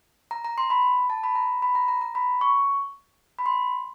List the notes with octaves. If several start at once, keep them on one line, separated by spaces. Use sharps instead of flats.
A#5
A#5
C6
B5
A5
B5
A#5
B5
A#5
A#5
A#5
B5
C#6
B5
C6